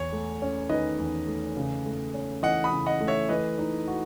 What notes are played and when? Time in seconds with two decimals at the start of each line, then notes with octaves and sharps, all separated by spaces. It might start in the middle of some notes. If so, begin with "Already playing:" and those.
Already playing: E2 C#5
0.12 A3
0.42 C#4
0.70 D#3 B4 D#5
0.99 E2
1.27 A3
1.57 C#3
1.86 A3
2.14 C#4
2.43 E3 D#5 F#5
2.64 B5 D#6
2.72 C#3
2.86 D#5 F#5
3.01 A3
3.07 C#5 E5
3.29 E3 B4 D#5
3.58 D#4
3.88 F#4